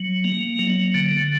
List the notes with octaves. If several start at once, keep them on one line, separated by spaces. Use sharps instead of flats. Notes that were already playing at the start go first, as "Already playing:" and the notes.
Already playing: F#3
A#3
F#3
D3